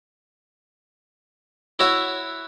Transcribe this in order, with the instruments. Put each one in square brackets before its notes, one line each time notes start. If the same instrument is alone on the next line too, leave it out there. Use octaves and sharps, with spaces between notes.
[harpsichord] E4 F#4 C#5 E5